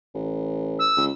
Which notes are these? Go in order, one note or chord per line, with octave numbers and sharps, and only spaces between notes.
A1
E6
C#2